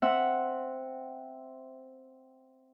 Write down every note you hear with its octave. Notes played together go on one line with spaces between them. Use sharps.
C4 E5 F#5